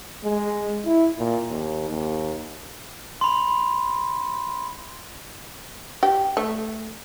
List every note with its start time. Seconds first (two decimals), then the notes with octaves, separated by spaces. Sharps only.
0.24 G#3
0.85 E4
1.19 A#2
1.50 D#2
1.90 D#2
3.21 B5 C6
6.03 G4
6.37 A3